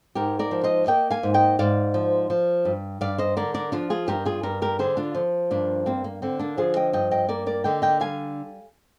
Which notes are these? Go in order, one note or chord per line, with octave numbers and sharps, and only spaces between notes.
G#2 G4 A#4
A#4 D5
F3
C5 D#5
A#3 D#5 G5
F5 G#5
G#2
D#5 G5
G#2 D5 F5
F3
F3
G2
G2 D5 F5
C5 D#5
D3 A#4 D5
A#4 D5
F3 D4 F4
F4 G#4
G2 G4 A#4
F4 G#4
G2 G4 A#4
G4 A#4
D3 G#4 C5
D4 F4
F3
G2 A#3 D4
A#3 C4
A#3
D3 C4
A#3 D4
F3 F4 G#4
D#5 G5
G2 D#5 G5
D#5 G5
A#3 A#4 D5
A#4 D5
D3 D#5 G5
D#5 G5
G3 F5 G#5